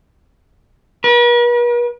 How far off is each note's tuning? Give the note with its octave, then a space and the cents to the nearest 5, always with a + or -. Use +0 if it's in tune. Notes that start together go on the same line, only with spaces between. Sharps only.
B4 -45